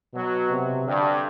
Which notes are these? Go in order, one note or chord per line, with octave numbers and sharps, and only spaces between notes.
B2 F#3
C3
G2 D3